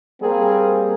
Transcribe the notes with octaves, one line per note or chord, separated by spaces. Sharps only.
G3 A#3 C4 G#4 A#4